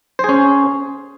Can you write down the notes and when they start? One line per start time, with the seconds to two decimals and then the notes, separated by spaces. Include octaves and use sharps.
0.19 C5
0.24 G#4
0.29 C#4